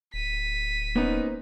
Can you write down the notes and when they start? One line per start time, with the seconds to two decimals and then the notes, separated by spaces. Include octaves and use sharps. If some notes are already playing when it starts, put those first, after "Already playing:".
0.14 D1 B6 D#7
0.96 A#3 B3 C#4 D#4 A#4 C5